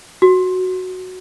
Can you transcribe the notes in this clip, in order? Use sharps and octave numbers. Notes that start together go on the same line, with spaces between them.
F#4